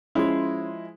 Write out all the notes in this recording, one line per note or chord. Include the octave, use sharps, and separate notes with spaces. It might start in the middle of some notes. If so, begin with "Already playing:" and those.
F3 G#3 C#4 E4 C6